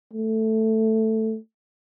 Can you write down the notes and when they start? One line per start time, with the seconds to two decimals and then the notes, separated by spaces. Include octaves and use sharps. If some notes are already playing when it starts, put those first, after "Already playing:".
0.13 A3